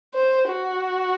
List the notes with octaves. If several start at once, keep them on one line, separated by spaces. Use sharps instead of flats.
C5
F#4